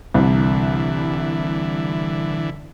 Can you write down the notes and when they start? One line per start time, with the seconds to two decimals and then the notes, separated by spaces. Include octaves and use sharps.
0.14 C2 D3 E3